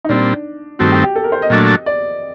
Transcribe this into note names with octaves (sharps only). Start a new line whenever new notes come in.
D#4
A#2 G3 C4 D4
G2 D#3 A3 C4 F#4
G4
G4
A4
A#4
C5
D#5
A#2 F#3 A3 D4
D5